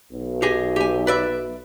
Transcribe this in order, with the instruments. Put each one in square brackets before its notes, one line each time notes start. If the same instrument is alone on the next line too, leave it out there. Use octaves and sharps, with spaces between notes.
[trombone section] B1
[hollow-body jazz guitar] G4 G#4 D#5
G4 G#5
B4 D5 E5